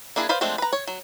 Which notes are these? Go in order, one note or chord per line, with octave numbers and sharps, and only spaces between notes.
A#3 D4 E4 G#4
B4 C5 D5 F5
F3 G#3 A3 C4 D4
B4 A#5
C#5
F#3